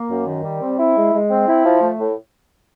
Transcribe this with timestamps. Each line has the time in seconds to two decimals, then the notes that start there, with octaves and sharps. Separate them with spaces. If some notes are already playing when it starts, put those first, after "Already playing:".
Already playing: A#3
0.10 F#2
0.27 D#3
0.43 G3
0.61 C4
0.79 E4
0.96 G#3
1.13 G#3
1.31 C4
1.48 E4
1.65 F3
1.82 A3
1.99 A2